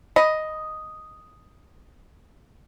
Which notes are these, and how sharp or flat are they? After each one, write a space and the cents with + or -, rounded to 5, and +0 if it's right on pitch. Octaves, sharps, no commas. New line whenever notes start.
D#5 +0 B5 +0